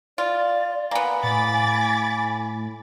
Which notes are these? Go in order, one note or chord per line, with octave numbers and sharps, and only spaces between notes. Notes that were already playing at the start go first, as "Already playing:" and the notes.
F4 D5
A#3 B3 G#5
A2 B5 D6 A6